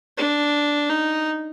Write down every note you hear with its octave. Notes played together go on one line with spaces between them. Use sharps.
D4
D#4